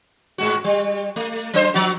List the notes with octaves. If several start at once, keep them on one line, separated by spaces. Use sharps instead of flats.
G#2 G#3 F#4
G3
A3
F#3 D4 C5
F3 F#4